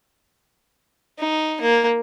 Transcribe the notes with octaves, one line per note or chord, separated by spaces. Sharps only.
D#4
A#3